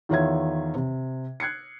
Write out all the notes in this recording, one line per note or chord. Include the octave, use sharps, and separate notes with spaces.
E2 D#3 F4 C#5 E5 G#6
C3
F#6 G#6 C7 C#7